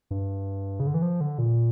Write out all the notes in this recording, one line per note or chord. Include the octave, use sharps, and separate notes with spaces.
G2
C#3
D3
E3
F3
D3
A#2